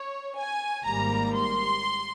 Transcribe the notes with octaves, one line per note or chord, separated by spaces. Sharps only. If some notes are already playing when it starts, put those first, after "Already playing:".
Already playing: C#5
G#5
G#1 G#2 G3 A#3 A#5
C6